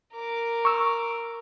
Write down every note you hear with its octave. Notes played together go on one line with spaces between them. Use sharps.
A#4 D6
C#6 E6